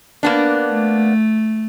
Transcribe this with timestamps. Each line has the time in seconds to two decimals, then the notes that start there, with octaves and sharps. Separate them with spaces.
0.23 A#3 B3 D4
0.70 A3